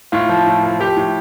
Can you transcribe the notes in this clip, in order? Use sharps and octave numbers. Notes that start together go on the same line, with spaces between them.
A2 F4
F3
A2
F3
F3 G4
A2